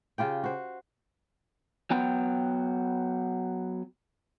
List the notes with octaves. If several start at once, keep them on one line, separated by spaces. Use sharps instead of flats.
C#3 F4 G4 G5
F#4 C5
F#3 B3 G5